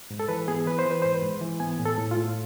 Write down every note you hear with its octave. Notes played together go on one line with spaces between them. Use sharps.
G#2
A4
E3 B4
B3 G#4
E3 B4
C5
E3
B4
G#2 C5
B4
G#2
E3
B3 G#5
A2
A4
A2
F4
A2